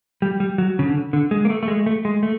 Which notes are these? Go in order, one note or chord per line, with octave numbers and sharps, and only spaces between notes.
G3
G3
F#3
C#3
D3
D3
G#3
A#3
A3
A3
G#3
A3
G#3
A3